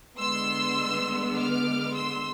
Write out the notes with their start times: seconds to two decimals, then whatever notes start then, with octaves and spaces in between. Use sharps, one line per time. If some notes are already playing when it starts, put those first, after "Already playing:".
0.18 D3 G#3 B3 C6 E6
1.36 D6 F6
1.94 C6 E6